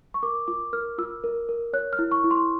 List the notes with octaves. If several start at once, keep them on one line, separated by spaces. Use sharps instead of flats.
C#6
A#4 D6
F4 D6
A#4 F6
F4 E6
A#4
A#4
C#5 F#6
F6
E4
C#6
E4
C6